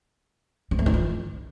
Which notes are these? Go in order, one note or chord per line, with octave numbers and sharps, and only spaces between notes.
C4
A3
D#4
F4